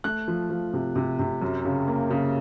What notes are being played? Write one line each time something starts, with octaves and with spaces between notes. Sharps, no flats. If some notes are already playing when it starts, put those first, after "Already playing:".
A3 F#6
F3
F3
C3
C3
C3
F#2
C#3
A#3
C#3